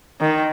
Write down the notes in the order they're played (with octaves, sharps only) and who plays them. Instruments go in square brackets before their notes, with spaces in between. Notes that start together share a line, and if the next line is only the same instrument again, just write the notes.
[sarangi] D#3